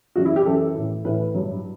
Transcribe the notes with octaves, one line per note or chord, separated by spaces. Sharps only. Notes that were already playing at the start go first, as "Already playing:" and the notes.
F#2 E3 F#4
E4
G4
F#2 E3 A4
A2 E3
A2 E3 B4
G2 F#3